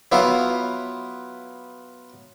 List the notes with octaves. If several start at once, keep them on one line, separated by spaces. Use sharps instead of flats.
F#3 B3 E4 F4